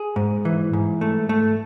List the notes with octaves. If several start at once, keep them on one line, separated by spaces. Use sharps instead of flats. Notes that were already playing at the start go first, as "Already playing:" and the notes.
Already playing: G#4
G#2
E3
G#2
A3
A3